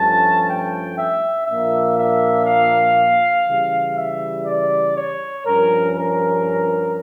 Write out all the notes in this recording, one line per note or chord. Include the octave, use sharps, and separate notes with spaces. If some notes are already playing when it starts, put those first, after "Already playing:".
Already playing: G2 F3 A3 C#4 A5
G5
E5
A#2 F3 A#3 D4 E5
E5
F5
C#3 E3 G3
E5
D5
C#5
G2 F3 C#4 A#4
A#4